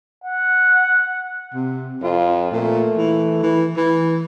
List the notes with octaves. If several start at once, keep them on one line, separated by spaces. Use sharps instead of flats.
F#5
C3
F2 F4
A#2 A3
E3
E3
E3